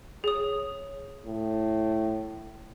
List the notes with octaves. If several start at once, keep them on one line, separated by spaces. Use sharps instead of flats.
G#4 C#5 D#6
A2